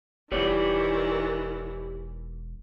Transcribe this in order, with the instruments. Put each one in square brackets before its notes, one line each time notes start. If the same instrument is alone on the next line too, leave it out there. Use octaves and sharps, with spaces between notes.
[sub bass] E1 [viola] D#3 E3 [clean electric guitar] G4 C#5 D5